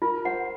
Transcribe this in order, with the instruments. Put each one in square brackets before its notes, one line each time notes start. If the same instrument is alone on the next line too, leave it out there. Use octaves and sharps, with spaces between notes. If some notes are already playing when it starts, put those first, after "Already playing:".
[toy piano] F4 [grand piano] A#4
[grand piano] C5 [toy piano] F#5